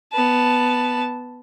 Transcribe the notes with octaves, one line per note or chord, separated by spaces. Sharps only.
B3 A5